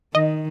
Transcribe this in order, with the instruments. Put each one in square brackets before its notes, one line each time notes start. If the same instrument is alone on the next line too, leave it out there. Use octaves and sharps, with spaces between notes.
[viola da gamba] D#3 [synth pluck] D#5